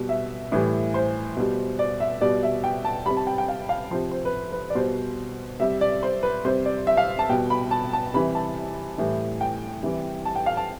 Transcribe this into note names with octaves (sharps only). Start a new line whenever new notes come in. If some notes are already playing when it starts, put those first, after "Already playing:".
Already playing: B2 G3
E5
A2 E3 G3
C5
B2 G3
D5
E5
B2 G3 D5
E5
G5
A5
C3 G3 B5
A5
G5
G5
F5
F5
C3 F3 C5
C5
B4
B4
D5
B2 G3 C5
C3 G3 E5
D5
C5
B4
C3 G3 C5
D5
E5
F5
A5
B2 G3 G5
B5
A5
A5
C3 E3 G3 B5
A5
A2 E3 G3
G5
C3 E3 G3
A5
G5
F5
A5